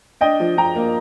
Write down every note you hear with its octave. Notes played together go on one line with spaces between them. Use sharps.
D4 D#5 G5
F3
F3 G5 A#5
A#3